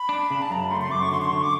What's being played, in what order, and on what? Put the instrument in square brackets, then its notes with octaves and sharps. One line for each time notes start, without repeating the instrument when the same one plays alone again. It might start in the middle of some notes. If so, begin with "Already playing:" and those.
Already playing: [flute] B5
[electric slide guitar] D4
C#3
[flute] A5
[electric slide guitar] F#2 [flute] A#5
[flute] B5
[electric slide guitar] A3 [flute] C6
[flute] C6
[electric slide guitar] F#2 [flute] D6
[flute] C#6
[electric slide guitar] D3 [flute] C6
[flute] C6
[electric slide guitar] D3 [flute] C#6
[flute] D6